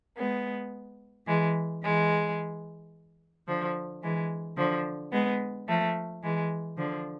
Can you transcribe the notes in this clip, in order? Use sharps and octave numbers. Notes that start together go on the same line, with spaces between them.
G#3 B3
E3 G#3
E3 G#3
D3 F3
E3 G#3
D3 F3
G#3 B3
F3 A3
E3 G#3
D3 F3